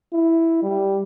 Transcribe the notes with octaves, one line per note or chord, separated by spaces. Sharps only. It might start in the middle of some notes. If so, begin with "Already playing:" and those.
E4
G3